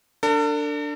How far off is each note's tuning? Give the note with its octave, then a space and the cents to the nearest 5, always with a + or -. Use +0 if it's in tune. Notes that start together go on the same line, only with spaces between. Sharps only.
D4 +0 A4 +45